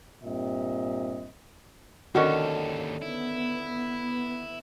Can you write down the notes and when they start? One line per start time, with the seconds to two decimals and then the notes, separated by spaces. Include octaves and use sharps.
0.24 G2 A#2 C4 G4 D#5 E5
2.15 D#2 D3 D#3 C#4 F#4 A4
3.02 B3 E4